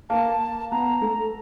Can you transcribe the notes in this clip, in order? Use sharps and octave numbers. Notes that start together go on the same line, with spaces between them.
A#3 A5
B3 A#5
A3